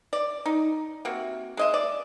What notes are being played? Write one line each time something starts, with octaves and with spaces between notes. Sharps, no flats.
D5
D#4
C3 A#3 F#4
G#3 D#5 E5
D5